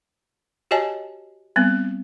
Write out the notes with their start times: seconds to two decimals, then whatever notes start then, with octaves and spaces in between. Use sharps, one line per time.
0.71 F#4 G4 C#5 D#5 G#5 A5
1.56 G3 B3 C4